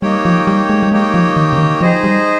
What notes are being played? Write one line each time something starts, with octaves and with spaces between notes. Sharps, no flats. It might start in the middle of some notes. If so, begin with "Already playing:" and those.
G3 A#3 D#4 G4 C#5 G5
F3
G3
G#3
G3
G#3 A#3 D#4 G4 C#5 G5
F3
D#3
C#3
D#3
F3 D#4 G#4 C5 D#5
G3